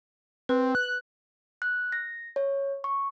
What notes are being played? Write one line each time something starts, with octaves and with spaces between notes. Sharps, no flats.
C4 B4
F#6
F#6
A#6
C#5
C#6